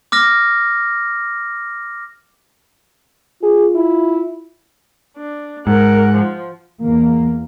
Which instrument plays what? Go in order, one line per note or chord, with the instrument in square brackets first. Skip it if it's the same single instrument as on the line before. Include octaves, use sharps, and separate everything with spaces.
[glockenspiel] D6 F6 A#6
[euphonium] F4 [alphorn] G#4
[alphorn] E4
[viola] D4
[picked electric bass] G#2 [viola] A#4 F#5
[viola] F3
[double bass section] E2 A#3